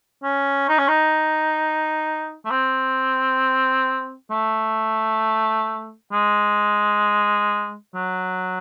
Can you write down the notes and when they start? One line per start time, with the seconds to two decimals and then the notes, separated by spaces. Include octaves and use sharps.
0.23 C#4
0.69 D#4
0.78 C#4
0.88 D#4
2.45 A3
2.51 C4
4.31 A3
6.12 G#3
7.95 F#3